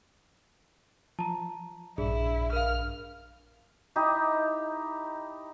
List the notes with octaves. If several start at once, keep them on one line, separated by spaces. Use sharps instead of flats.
F3 A5 A#5
A#1 G2 D4 E4 G#4
A#4 F5 F6
D#4 E4 G4